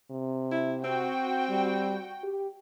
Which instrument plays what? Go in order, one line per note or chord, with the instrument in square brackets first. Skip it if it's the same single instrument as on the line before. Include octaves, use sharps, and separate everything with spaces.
[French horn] C3
[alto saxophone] E4
[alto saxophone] C4 [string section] F#4 G5
[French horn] G3
G4